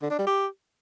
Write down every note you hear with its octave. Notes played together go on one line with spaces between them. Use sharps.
D3
D4
G3
G4